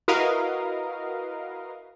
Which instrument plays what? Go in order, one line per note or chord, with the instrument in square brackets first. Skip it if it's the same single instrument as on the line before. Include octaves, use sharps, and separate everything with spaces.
[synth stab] E4 F#4 A#4 B4 D#5 F5